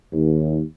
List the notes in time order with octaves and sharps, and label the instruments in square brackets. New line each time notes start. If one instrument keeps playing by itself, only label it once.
[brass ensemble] D#2